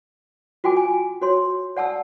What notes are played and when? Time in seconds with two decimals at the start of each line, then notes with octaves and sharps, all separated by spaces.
0.64 F4 F#4 G5 G#5 D6
0.77 G#5
1.22 F#4 C#5 C6
1.77 D5 F#5 A5 E6